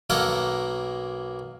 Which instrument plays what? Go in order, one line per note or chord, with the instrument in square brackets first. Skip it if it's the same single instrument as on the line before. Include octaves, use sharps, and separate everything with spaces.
[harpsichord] B1 A#3 A4 A#4 C#5 F#5